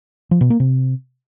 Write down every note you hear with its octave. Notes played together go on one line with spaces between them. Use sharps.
F3
B2
A#3
C3